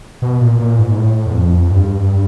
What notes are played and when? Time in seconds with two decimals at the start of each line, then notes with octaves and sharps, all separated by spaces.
0.22 B2
0.41 A#2
0.59 A#2
0.79 G#2
0.97 A2
1.26 E2
1.35 F2
1.71 G2